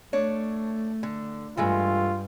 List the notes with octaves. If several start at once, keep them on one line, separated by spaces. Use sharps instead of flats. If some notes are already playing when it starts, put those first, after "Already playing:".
A3 D4 C#5
D3
G2 E3 G#3 A3 F4